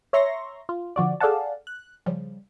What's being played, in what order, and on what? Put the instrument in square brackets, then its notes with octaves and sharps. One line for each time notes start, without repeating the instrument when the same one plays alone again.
[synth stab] C#5 E5 A#5 C6 C#6 A#6
F4
D3 F3 F#4 D5
G#4 A4 D5 F5 F#5 A5
F#6
C#3 F3 G3